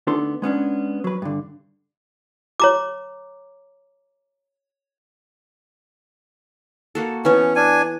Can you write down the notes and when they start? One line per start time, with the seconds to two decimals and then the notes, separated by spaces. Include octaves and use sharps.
0.07 D2 B3 D4 D#4 A4 C6
0.42 G#3 B3 C#4 D4
1.04 F#3 B4
1.22 G2 D3
2.60 C#5 A#5 D6
6.95 A#3 F#4 A4
7.25 E3 B3 C#4 C#5
7.56 D4 G#5